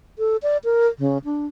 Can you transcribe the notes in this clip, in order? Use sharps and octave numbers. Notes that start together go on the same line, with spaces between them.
A4
D5
A#4
C#3
D4